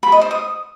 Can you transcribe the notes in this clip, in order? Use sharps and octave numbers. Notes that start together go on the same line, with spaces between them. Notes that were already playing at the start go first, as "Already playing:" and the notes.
B5
D#5
C5
D#6